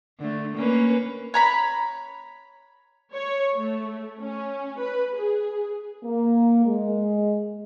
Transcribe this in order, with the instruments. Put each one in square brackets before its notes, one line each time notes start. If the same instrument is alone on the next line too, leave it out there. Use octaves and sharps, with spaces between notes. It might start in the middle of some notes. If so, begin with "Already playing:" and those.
[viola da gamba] D3 A3
A#3 C#4 B4
[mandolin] C#5 A#5 B5
[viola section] C#5
A3
C#4
B4
G#4
[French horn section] A#3
G#3